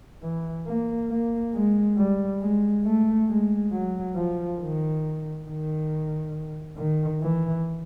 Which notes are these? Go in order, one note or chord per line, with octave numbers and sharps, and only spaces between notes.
E3
A#3
A#3
G#3
G3
G#3
A3
G#3
F#3
F3
D#3
D#3
D#3
E3